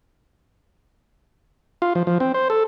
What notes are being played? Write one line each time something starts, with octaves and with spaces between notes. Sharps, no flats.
F4
F3
F3
C4
C5
A4